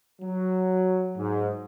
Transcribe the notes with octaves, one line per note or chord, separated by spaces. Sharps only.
F#3
G#2